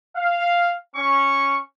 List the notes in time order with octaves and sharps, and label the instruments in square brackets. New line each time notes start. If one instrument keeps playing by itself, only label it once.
[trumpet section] F5
C#4 C#6